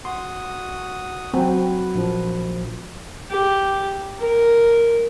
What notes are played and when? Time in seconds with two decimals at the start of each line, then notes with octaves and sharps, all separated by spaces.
0.05 F#4 C6 D#6
1.34 F#3 C4 B4
1.95 A#1 F3
3.30 G4
4.19 A#4